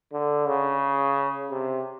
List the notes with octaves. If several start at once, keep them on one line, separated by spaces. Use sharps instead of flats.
D3
C#3
C3